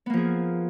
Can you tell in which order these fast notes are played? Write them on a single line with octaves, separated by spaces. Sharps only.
B3 A#3 F3 G#4